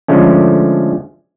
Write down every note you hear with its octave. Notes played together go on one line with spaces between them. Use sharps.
D3 F3 G#3 A3 C#4